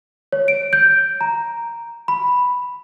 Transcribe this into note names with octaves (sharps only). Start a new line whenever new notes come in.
C#5
D7
G6
A#5
B5